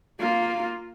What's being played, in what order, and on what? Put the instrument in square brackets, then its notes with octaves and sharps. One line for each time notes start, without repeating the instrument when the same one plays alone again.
[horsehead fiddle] A#3 F4